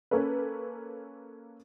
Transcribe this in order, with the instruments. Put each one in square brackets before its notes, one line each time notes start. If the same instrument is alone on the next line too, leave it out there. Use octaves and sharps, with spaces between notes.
[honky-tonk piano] A#3 C#4 A4 B4